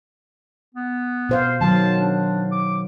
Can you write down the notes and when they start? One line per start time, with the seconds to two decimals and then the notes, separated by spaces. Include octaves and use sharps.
0.75 B3
1.29 B2 C5 F5
1.61 D#3 F#3 A5
2.00 D4
2.52 D6